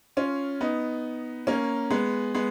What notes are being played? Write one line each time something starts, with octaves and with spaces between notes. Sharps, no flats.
C#4 F4
B3 D#4
A#3 C#4
G#3 B3
G#3 B3